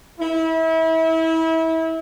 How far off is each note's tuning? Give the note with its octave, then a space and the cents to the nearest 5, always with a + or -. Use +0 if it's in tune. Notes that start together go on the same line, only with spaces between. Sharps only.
E4 -30